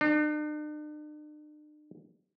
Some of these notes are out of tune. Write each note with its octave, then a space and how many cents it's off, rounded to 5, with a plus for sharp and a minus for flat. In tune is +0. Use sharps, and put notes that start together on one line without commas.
D4 +45